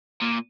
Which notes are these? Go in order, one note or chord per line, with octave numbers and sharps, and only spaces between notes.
A#2